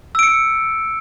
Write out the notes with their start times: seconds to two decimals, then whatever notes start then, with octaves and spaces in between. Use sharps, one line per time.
0.15 E6
0.19 D7
0.23 C#7